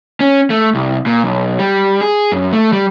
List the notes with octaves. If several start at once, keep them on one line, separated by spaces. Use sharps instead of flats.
C#4
A3
C2
A#2
B1
G3
G#4
F#2
A3
G3